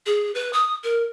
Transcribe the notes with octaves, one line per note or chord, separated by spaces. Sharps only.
G#4
B4
D#6
A#4